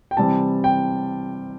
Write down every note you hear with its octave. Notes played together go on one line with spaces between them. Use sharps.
G5
C3 E3 G3 C4 A5
G5